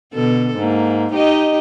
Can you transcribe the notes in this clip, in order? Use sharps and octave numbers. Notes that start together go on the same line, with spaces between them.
B2 D3 A4
G#2 A#3
D#4 G4 D#5